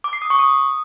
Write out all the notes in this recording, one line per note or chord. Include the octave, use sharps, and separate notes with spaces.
D6
C7
D#6
C#6
D#6